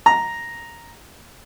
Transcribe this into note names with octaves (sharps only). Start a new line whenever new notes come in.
A#5